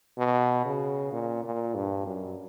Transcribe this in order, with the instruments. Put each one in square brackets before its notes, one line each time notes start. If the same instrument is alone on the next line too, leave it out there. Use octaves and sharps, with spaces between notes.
[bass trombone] B2
C#3
A#2
A#2
G2
F#2